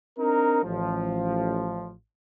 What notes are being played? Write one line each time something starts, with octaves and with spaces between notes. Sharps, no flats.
C4 D4 D#4 A#4
A1 F3